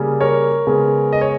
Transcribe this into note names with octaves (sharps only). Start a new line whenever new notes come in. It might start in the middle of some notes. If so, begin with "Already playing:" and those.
Already playing: C#3 G3 A#3
A#4 C#5
C#3 G#3 B3
D#5
C#5